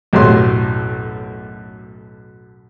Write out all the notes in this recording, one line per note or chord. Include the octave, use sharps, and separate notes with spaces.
B1 F#2 A2 G4 C6